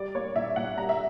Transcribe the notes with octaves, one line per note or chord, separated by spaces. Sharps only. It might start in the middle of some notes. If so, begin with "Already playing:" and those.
Already playing: G3 D5
A#3 C#5
A#2 E5
A#2 F#5
G3 A#5
E5